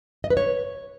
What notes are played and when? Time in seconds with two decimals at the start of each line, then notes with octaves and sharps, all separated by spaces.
0.24 D#5
0.30 B4
0.37 C#5